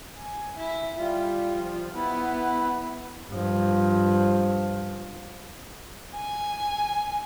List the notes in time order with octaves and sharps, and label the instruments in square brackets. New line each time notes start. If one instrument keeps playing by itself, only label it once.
[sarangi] G#5
E4
[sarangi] G3 [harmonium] F4
[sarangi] F3
[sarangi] B3 [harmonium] E4
[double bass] G2 F3
[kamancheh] G#5